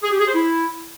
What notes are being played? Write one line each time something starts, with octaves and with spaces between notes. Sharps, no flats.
G#4
G4
G#4
C5
E4